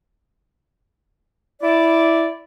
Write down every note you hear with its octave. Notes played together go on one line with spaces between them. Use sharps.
E4 D5